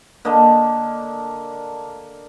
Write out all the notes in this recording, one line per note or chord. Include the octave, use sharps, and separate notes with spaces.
D3 A#3 D#5 A5